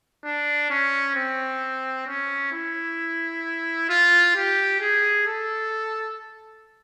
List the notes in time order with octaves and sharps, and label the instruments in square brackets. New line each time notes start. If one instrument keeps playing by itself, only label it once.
[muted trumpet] D4
C#4
C4
C#4
E4
F4
G4
G#4
A4